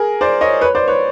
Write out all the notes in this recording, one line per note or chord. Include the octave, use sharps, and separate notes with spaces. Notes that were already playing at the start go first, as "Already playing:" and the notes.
Already playing: G#4 A#4
C5 D5
C#5 D#5
B4 C#5
C5 D5
B4 C#5